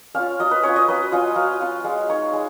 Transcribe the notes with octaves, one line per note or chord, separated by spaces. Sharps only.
C#4 F4 F5
F#3 D#5
B4
C#4 F4 C#5
D#5
F#3 B4
C#4 F4 D#5
F#3 F5
C#4 F4
G#3 F5
D#4 C#5
G#3